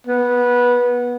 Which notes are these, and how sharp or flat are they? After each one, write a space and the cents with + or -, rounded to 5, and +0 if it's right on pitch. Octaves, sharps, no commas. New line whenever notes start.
B3 -15